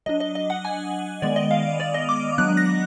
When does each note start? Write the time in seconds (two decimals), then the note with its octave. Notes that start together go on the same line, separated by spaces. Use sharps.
0.06 F#3 D4 D#5
0.20 D#5
0.35 D#5
0.50 F#5
0.65 G#5
1.22 D#3 G#3 B3 D5
1.36 D#5
1.51 F5
1.80 D5
1.94 D#5
2.09 D6
2.38 F#3 B3 D4 F#6
2.57 A#6